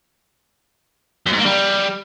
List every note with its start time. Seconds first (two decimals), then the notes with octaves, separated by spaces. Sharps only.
1.26 F#2
1.33 G#2
1.39 A#3
1.46 G3